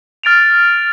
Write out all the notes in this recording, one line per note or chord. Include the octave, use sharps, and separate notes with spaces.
F6 A6 D7 F7